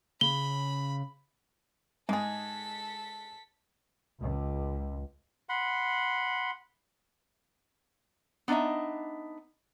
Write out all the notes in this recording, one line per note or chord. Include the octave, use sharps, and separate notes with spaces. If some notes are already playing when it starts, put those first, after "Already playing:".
C#3 B5 G7
G#2 G#3 G#4 A4 B6
C#2
F#5 B5 C6
B3 D4 D#4 D#5 E5